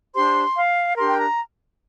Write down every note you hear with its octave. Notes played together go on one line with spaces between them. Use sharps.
D4 G4 C5 C6
F5
D4 G4 A#4 C6
G5
A#5